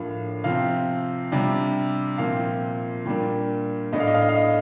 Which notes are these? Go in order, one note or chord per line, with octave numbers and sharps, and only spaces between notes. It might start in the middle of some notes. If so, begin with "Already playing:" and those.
Already playing: A2 F3 A#3 D4 F5
C3 F3 C4 F5
C3 G3 D4
A#2 F3 C4 F5
A#2 G3 A#3 D4
A2 A3 D4 D#5
F5
D#5
F5
D#5
F5
D#5